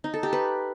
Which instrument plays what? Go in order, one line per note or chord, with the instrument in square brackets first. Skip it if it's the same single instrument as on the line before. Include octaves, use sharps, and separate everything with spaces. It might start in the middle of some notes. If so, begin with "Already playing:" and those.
[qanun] D#4
A4
G4
B4